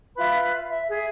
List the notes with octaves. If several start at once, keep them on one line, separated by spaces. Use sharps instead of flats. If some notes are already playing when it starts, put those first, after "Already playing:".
F4 B4 E5 B5
E5
G#4 E5